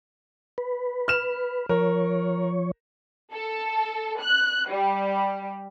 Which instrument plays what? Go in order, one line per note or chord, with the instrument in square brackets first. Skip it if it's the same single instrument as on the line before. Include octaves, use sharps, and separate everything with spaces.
[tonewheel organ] B4
[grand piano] F6 E7
[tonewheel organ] F3 C#5 [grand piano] A#4
[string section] A4
F#6
G3